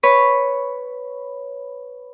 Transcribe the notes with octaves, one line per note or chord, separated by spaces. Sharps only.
B4 C#5